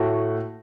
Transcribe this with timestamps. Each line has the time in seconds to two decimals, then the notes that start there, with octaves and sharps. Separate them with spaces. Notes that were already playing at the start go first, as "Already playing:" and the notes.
Already playing: A2 A3 F#4